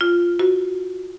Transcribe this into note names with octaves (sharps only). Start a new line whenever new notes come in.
F4
F#4